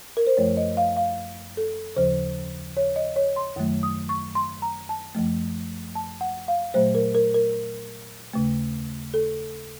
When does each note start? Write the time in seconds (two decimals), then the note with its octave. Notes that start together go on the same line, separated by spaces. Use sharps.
0.17 A#4
0.27 C5
0.37 F#2 F3 A3 C#5
0.57 D#5
0.77 F5
0.97 F5
1.57 A4
1.96 D#2 C#3 F3 C5
2.77 C#5
2.96 D#5
3.16 C#5
3.36 C6
3.56 F#2 D#3 F#3 A3
3.83 D#6
4.09 C#6
4.35 C6
4.62 A#5
4.89 A5
5.15 F#2 F3 A3
5.95 A5
6.21 F#5
6.48 F5
6.74 A#2 F#3 A3 C5
6.95 A#4
7.15 A#4
7.34 A#4
8.34 D#2 C#3 A3
9.14 A4